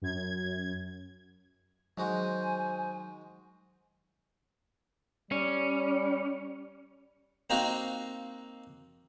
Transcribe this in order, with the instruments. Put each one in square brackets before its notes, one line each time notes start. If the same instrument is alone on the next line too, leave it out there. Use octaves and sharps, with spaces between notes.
[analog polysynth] F#2 G#6
[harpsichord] D#3 G#3 F#4 [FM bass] F#3 [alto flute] C5 [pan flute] G#5
[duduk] G3 [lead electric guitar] C#4
[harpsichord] A#3 C4 D#4 F4 F#4